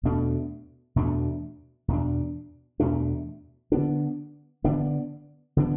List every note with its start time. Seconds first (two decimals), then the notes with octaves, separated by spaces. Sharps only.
0.03 E2 B2 A3 D4
0.96 E2 B2 A3 D4
1.88 E2 B2 A3 D4
2.80 E2 B2 A3 D4
3.72 D3 B3 D4
4.64 D3 B3 D4
5.57 D3 B3 D4